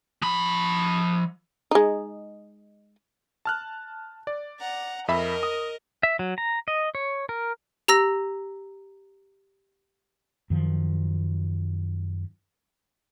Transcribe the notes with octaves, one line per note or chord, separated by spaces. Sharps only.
F3 B5
G#3 D#4
A5 F6 F#6
D5
F#5 A#5
F2 A#4 D#5 E5 B5
D#6
E5
F#3
A#5
D#5
C#5
A#4
G4 A#5 E6 A#6
F#2 D#3 F3